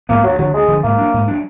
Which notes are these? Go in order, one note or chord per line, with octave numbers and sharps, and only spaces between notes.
G#2 F3 A#3 B3
D2 F#3
D3 F3 F#3
D2 G#3
D3 F3
G#2 A#3
F#3 D4
G#2
F#3 D4